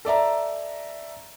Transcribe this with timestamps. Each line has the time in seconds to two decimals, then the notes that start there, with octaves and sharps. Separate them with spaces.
0.05 A4 D5 E5 A#5